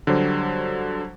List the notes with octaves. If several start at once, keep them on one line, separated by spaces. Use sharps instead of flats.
D3 F#3 G3 C5